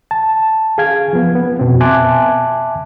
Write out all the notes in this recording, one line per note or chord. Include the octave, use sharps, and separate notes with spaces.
A5
G#4 F5 G#6
F3 B3
B3
F2 B2 C4
E5 G#5 A5 C6 D6 F#6